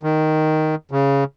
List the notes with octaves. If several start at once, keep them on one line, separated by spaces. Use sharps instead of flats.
D#3
C#3